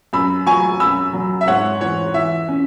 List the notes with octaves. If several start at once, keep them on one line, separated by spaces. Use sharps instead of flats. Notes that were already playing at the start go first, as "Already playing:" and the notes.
F#2 B5 E6
F#3 G#5 C#6
F#2 B5 E6
F#3
E5
G#2 C#5 F#5
E3 C#5
E3 E5
C#4